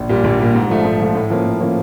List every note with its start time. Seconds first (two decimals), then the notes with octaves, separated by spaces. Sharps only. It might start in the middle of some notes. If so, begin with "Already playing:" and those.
Already playing: A#1
0.09 A#2 G3
0.24 A#1
0.40 A#2 G3
0.55 G#2
0.70 F3 A3
0.85 G#2
1.01 F3 A3
1.15 A2
1.30 F3 A#3 C#4
1.45 A2
1.61 F3 A#3 C#4